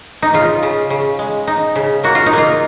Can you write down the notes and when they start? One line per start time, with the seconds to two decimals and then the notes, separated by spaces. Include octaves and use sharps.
0.22 D#4
0.34 C#3 F4
0.63 C#3
0.90 C#3
1.19 G#3
1.47 D#4
1.76 C#3
2.04 A#3 F#4
2.15 F4
2.26 D#4
2.33 A#3
2.38 F4